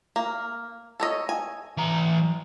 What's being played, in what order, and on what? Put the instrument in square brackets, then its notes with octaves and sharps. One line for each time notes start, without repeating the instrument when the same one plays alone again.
[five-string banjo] A#3
A4 C#5 D#5
G#5
[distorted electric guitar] E3 A#5